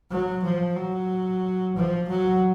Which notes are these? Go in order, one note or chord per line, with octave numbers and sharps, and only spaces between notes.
F#3
F3
F#3
F3
F#3